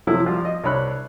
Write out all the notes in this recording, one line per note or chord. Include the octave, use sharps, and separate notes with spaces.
C3 F3 F#3 A3 B3 E4
F3 G3
D#5
C2 D4 C#5 B5 F#6